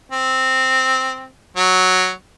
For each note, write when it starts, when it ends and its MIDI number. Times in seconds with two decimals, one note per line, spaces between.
0.12 1.28 60
1.57 2.09 54